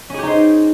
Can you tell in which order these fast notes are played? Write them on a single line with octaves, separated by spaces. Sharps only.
C#4 G#4 G4 D#4 C5